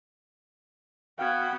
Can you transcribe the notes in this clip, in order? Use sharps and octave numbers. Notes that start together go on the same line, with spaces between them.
B3 F#4 F5 G5 F6 G#6